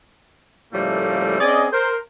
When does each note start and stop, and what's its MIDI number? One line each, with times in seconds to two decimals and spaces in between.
0.72 1.38 45
0.72 1.38 49
0.72 1.38 53
0.72 1.38 55
0.72 1.38 57
0.72 1.38 58
1.39 1.66 60
1.39 1.66 61
1.39 1.66 68
1.39 1.66 74
1.39 1.66 75
1.71 1.97 70
1.71 1.97 72